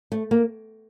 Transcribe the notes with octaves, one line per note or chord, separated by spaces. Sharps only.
A3
A#3